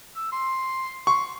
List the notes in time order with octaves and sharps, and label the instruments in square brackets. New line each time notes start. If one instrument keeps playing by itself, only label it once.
[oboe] E6
C6
[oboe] C6 [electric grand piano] C#6